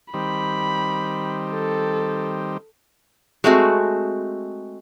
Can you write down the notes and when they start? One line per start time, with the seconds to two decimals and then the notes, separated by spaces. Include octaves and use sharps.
0.14 D#3 G3 C4 B5
1.51 A4
3.44 G#3 A3 C4 F#4